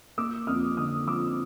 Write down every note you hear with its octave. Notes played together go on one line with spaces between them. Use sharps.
A#3 D6 E6
F2 D#6 F6
D3 D#6 F6
F3 D6 E6